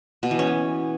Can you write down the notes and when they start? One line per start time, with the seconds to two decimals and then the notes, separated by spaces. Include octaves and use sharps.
0.23 B2
0.31 E3
0.39 C#4
0.47 B3